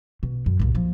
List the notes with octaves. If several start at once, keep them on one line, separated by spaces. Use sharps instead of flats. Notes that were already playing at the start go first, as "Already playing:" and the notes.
B2
F#2
C2 A#2
F3 A#3